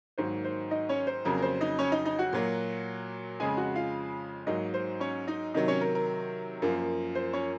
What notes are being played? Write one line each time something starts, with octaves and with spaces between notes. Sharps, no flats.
G#2 D#3 F#3 A#3 C5
C5
D#4 D#5
C#4 C#5
C5
F2 C#3 F#3 A#3 A#4
A#4
C5
D#4 D#5
C#4 C#5
D#4 D#5
D#4 D#5
F#4 F#5
A#2 F#3 A#3
F2 C#3 G#3 G#4 G#5
F#4 F#5
F4 F5
G#2 F#3 A#3 D#4 D#5
C5
C#4 C#5
D#4 D#5
C3 D#3 F#3 D#4 D#5
C#4 C#5
A#4
A#4
F#2 F3 A#3
C5
C#4 C#5